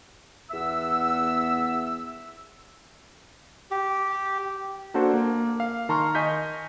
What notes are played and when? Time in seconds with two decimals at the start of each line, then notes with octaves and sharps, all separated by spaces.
0.50 E2 B3 E5 E6
3.71 G4
4.94 A#3 D4 F#4 A4 C5
5.14 A#3
5.60 F5
5.89 D#3 A5 A#5 C6 C#6 F6
6.15 D#5 G#5 C#6 G6 B6